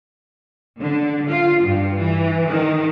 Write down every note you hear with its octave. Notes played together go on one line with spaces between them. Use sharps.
D3
F4
G2
E3
D#3